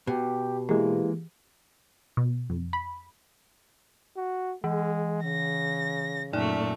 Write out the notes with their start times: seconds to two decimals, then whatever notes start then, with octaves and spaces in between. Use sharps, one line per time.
0.07 B2 G4
0.69 E3 G#3 A#3 G4 G#4 F5
2.17 B2
2.50 F2
2.73 B5
4.17 F#4
4.64 E3 G#3
5.24 C#3 A#6
6.33 F#2 A#2 A3 D#4 D5